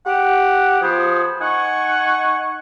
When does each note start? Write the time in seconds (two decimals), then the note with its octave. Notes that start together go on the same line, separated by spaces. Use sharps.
0.06 G4 F#5
0.81 F3 B3 G#4 C5
1.41 D#4 F#5 G#5 C#6